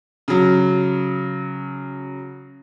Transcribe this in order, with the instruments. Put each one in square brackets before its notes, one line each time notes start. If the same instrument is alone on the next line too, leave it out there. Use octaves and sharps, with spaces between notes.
[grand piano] C#3 F#3